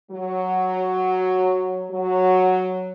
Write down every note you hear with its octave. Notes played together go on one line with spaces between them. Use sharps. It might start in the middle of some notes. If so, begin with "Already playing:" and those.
F#3
F#3